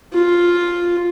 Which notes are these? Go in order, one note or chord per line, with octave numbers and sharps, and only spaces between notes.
F4